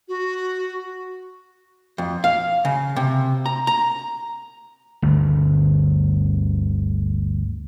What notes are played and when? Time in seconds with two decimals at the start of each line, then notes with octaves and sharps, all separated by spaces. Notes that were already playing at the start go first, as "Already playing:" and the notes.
0.08 F#4
1.98 F2
2.24 F5
2.65 C#3
2.96 C3
3.46 A#5
3.67 A#5
5.02 G1 D2